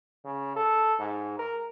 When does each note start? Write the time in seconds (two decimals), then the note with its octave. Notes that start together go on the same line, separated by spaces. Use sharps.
0.25 C#3
0.56 A4
0.99 G#2
1.39 A#4